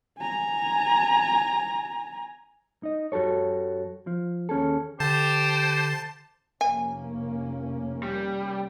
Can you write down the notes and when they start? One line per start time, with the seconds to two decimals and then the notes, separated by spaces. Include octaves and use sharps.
0.19 G#5 A#5
2.83 D#4 D#5
3.12 F#2 F#4 G4 A4 C#5
4.07 F3
4.49 D#2 C#4 G#4 A4
5.00 D3 G4 C5 A5
6.61 F1 A#3 C#4 G#5
8.03 G3